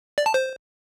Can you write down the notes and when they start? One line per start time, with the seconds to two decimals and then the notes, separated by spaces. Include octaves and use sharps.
0.18 D5
0.26 A5
0.34 C5